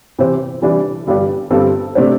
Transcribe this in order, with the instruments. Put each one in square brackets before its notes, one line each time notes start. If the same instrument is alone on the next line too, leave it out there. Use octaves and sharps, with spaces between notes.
[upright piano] C3 E3 C4 G4 C5
C3 E3 G3 D4
G1 G2 G3 D4 G4
G1 G2 G3 C4 A4
C3 A3 D4 C5